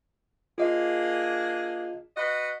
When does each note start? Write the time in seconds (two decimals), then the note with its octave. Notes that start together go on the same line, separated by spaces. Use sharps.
0.58 A#3 D4 F4 G#4 D#5
2.16 F#4 B4 D#5